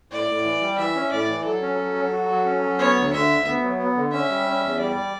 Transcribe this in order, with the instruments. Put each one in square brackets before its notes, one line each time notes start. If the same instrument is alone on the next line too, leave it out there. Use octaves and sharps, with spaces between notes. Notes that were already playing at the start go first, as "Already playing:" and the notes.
[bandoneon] A2 [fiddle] D5
[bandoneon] A2
E3
G3
[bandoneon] E3 [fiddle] E5
[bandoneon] C#4
[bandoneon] A2 [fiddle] D5
[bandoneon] E3
[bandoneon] F#3 [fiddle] A4
[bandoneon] C#4
F#3
F#3
F#4
F#3
C#4
F#3
[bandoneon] B3 [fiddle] C#5
[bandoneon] D2
[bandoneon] D3 [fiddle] E5
[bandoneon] D2
B3
F#3
B3
D3
[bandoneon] C#4 [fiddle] E5
[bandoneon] G3
C#4
E2
[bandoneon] G3 [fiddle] D5